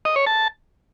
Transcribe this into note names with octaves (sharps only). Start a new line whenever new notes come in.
D#5
C#5
A5